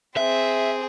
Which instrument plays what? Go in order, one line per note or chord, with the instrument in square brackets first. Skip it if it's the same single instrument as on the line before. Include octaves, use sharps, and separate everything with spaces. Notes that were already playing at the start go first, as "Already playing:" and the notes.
[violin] C4 G#4 [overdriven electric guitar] E5